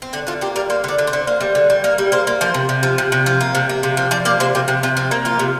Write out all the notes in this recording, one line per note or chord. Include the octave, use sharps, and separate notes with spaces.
C4
D3 D4
D3 F4
A#3 G4
G3 A#4
A#3 C5
D3 D5
D3
C5
D3
A#3
G3
D3
G3
A#3 A#4
G3
A#3 C5
A#3
F3 C5
C3
C3
F3
C3
C3
F3
A#3
C3
A#3
C3
F3
F3 D5
A#3 D5
C3 C5
C3 G4
C3 C4
C3 F4
F3 C4
A#3 C4
F3 F4
C3